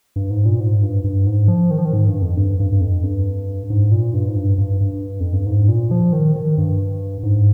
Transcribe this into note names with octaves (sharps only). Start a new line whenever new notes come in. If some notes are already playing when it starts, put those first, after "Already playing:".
G2
G#2
A#2
G#2
G2
G2
G#2
F3
D#3
F3
D#3
G#2
G2
F2
G2
G2
G2
F2
G2
G#2
A#2
G2
G#2
G2
G2
G2
F2
G2
G#2
A#2
F3
D#3
D#3
G2
G#2